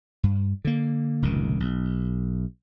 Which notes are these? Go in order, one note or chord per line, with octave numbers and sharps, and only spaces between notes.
G2
D3 A#3
F1 C#2 A#2 D#3
B1